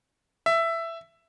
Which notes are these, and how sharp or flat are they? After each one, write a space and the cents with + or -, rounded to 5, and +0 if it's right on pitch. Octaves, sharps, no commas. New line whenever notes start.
E5 +10